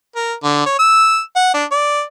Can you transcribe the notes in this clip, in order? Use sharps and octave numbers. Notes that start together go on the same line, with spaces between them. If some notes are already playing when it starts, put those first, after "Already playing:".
A#4
D3
C#5
E6
F#5
D4
D5